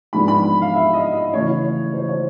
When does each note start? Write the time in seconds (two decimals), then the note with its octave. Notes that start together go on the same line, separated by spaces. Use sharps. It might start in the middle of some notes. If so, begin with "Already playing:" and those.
0.13 G#2 F3 G#3 B3 D4 B5
0.28 B5
0.62 F5
0.74 E5
0.93 D#5
1.13 D#5
1.34 C#3 E3 A3 C#5
1.94 C5
2.09 C#5